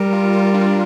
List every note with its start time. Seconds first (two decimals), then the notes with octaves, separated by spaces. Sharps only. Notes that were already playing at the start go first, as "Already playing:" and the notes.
Already playing: G3 A#4
0.13 F4
0.33 F4
0.54 D4